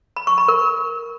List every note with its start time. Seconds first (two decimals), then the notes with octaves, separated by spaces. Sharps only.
0.16 B5
0.27 C#6
0.38 B5
0.48 A#4